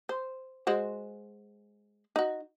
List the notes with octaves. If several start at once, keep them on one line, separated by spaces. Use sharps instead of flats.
C5
G#3 F#4 C5
D#4 F#4